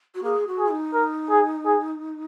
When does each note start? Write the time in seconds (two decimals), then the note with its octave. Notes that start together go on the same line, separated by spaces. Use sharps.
0.15 F#4
0.24 A#3 G#4
0.47 F#4
0.59 G#4
0.71 D#4
0.94 A#4
1.30 G#4
1.66 G#4